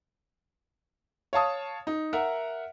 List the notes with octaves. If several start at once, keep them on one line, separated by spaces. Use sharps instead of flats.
C#5 F5 A5 D#6
D#4
A#4 E5 F#5